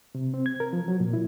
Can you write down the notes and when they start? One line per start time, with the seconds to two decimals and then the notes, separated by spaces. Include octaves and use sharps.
0.15 C3
0.34 C4
0.46 G#6
0.60 A#4
0.73 F3
0.88 F#3
1.00 A#2
1.13 E4